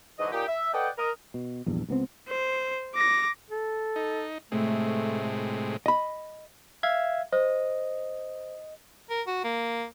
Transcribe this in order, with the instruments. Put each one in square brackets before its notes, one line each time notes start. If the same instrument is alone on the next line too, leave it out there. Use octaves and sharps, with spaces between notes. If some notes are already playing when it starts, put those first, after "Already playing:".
[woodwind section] E2 G#2 D3 F#3 D#5
A#2 D#4 G4
E5
A4 B4 D5 D#5 F#5 G5
A#4 D#5
[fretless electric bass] B2
A#1 E2 G2
C#2 B3 C4
[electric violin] C5
D6 A#6
[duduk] A4
[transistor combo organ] D#4
[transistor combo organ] A2 C3 G#3 [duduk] A3
[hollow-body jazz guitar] D#5 B5
[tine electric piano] E5 F5 G#6
[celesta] C5 [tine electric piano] D#5
[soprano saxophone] A#4
F#4
A#3